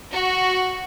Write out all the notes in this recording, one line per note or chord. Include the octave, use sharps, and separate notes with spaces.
F#4